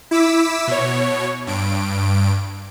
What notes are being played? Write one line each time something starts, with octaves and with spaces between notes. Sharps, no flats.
E4 D6 E6 B6
B2 C#5
G2 D7